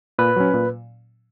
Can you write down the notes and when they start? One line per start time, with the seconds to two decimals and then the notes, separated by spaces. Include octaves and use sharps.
0.19 A#2 B4
0.36 F#3 C#4
0.54 A#2